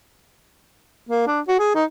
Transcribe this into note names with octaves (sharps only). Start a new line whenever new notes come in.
A#3
D4
F#4
G#4
D#4